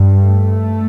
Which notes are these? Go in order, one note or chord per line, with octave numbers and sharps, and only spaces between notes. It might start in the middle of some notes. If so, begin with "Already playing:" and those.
Already playing: G2
A3